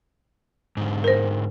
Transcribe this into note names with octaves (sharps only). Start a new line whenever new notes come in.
G#2 D3
A#4 C5